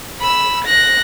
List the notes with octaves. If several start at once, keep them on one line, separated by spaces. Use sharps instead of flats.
B5 E6
F#6 A#6